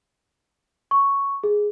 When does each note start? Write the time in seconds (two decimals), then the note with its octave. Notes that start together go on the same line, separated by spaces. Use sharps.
0.91 C#6
1.44 G#4